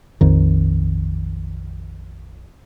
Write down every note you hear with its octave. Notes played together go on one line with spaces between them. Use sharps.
A#1 F2 D#3